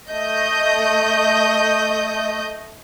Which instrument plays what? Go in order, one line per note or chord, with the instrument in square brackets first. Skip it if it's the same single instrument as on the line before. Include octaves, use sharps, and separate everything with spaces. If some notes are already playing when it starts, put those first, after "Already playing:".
[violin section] A3 D#5 G6